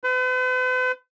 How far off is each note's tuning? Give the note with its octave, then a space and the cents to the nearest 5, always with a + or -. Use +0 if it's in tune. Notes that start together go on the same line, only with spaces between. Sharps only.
B4 +45